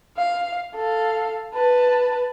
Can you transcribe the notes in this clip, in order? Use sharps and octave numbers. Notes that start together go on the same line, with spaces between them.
F5
A4 F5
B4 A5